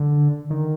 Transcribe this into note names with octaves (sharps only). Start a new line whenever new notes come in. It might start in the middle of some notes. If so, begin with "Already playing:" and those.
Already playing: D3
D#3